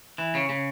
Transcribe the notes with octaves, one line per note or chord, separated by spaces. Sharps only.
E3
C#3
C#3